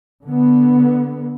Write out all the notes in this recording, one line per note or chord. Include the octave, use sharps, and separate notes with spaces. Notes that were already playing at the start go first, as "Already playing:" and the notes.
D3 B3